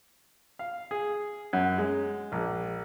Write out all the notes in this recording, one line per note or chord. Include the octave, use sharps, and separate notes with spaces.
F5
G#4
F#2
G#3
A#1